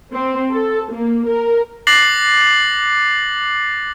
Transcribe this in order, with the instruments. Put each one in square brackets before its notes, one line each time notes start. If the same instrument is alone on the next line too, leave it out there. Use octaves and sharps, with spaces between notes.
[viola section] C4
A4
A#3
A#4
[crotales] D6 F#6 A6 A#6 C7 F#7